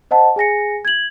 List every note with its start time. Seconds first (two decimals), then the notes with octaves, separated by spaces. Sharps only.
0.11 C5 D#5 F#5 A5
0.36 G#4 G#5 A#6 C#7
0.85 G#6 F#7